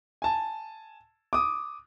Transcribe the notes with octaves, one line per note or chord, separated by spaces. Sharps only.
G#5 A5
D6 D#6